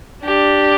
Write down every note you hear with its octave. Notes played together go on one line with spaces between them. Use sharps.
D4 G4